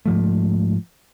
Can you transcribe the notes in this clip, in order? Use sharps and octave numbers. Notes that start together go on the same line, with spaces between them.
G#2 F3 A3